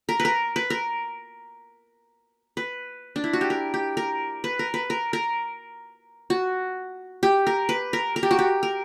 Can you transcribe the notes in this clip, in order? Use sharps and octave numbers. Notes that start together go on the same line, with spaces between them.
A#4
B4
A#4
B4
A#4
B4
D4
E4
F#4
G4
A#4
G4
A#4
B4
A#4
B4
A#4
A#4
F#4
G4
A#4
B4
A#4
A#4
G4
F#4
G4
A#4